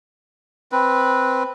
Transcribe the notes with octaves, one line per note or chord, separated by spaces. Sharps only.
C4 B4